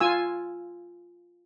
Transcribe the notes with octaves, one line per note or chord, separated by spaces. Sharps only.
F4 G#5 E6